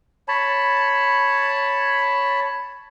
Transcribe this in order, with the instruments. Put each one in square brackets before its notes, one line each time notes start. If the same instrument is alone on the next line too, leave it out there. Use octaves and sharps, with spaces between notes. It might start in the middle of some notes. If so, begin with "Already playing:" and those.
[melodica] C#5 A5 B5